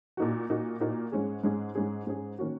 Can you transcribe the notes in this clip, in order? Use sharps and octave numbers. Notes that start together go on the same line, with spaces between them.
A#2 A#3 D#4 F#4
A#2 A#3 D#4 F#4
A#2 A#3 D#4 F#4
G#2 G#3 C#4 G#4
G#2 G#3 C#4 G#4
G#2 G#3 C#4 G#4
G#2 G#3 C#4 G#4
D#3 A#3 C#4 F#4